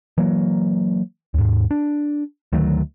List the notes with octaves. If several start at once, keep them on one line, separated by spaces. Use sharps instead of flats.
E3 F#3 A#3
D#2 G#2
D4
D2 D#3 F#3 A3